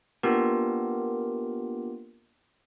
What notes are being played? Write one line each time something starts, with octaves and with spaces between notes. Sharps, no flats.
A#3 B3 D4 F4 G4 A#4